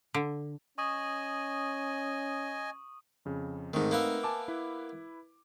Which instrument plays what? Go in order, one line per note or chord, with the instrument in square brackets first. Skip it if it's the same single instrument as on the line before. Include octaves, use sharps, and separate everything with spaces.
[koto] D3
[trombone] C#4 [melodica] D#5 G#5 [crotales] C#6 D#6 D#7
[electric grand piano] F2 C#3
[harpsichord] G#2 D#3 [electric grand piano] A3 C4 D#4
[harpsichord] A#3 B3 E5
[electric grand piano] G#5 A5 D6
E4 B4